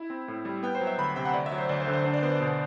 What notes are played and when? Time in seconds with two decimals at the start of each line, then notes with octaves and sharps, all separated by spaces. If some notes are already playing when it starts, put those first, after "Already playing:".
Already playing: E4
0.10 C4
0.28 A2
0.45 G3
0.63 B3 G5
0.75 C5
0.81 F#3
0.87 E5
0.98 D2 B5
1.16 C3 G5
1.25 F#5
1.34 D2 D5
1.46 E5
1.51 F#3
1.58 C5
1.69 D2 D5
1.81 C5
1.87 D3
1.93 C5
2.04 D4 C5
2.14 D5
2.22 B3 C5
2.32 D5
2.40 B2 C5
2.49 D5